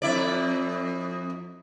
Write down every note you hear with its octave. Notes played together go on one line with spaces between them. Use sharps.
F2 E4 D5